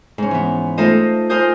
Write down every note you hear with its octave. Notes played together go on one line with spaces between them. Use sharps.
G#2 C#4
E3 B3
A3 D#4 F4 A4 C5 D#5
F4 A#4 C5 G#5 D#6 G6